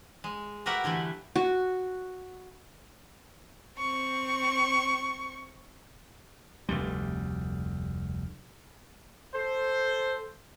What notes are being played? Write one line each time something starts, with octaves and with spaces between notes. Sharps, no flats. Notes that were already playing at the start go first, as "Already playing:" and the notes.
G#3
F#4 G4 A#4 B4 E5 F#5
D3 E3 G3 A3
F#4
C4 C#6
F1 D2 G3
A4 C5